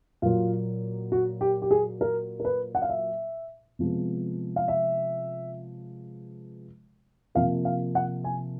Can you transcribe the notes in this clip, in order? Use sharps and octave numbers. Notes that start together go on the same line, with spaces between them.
A#2 F#3 A#3 F4
F#4
G4
G4
G#4
A#4
A#4
B4
F#5
F5
E5
C3 F3 G#3 B3
F5
E5
C3 F3 A#3 F5
F5
F#5
G#5